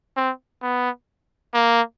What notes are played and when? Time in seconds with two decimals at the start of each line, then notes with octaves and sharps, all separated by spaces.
0.17 C4
0.62 B3
1.54 A#3